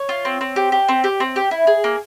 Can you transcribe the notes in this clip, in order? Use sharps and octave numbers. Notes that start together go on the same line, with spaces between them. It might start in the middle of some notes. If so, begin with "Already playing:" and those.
Already playing: C#5
F4
C4
C4
G4
G4
C4
G4
C4
G4
E4
G#4
A#3